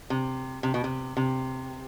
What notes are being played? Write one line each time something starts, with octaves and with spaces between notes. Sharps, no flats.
C3
C3
B2
C3
C3